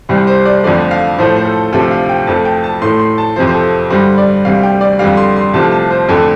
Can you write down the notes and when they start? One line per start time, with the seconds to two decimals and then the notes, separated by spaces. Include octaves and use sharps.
0.09 C2 C3 G3 C5
0.27 C5
0.45 D5
0.64 F2 D3 F3 A3 D5
0.91 F5
1.18 A2 F3 A3 C5
1.37 C5
1.45 A4
1.72 D2 C3 F3 A3 A4
1.91 F5
2.09 G5
2.27 F2 F3 A3 A5
2.45 G5
2.64 A5
2.82 A2 A3 C6
2.99 C6
3.18 A5
3.36 F2 C3 F3 C5
3.47 C5
3.55 A4
3.90 G2 D3 G3 C5
4.18 D5
4.45 D2 C3 G3 F5
4.63 G5
4.81 D5
4.99 F2 D3 G3 F5
5.17 C6
5.36 C6
5.53 C2 C3 F3 A3 A5
5.72 A5
5.90 C5
6.09 F2 D3 A3 A4